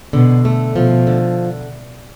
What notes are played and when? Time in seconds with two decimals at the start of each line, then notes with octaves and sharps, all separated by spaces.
0.13 B2 D3
0.45 A3
0.76 B2 F3
1.07 D3